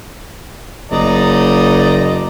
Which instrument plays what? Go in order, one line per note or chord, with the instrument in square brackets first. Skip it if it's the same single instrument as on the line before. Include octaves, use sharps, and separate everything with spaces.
[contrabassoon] F#1 [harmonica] D5 D#5 A#5